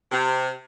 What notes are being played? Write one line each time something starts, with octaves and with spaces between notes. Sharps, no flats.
C3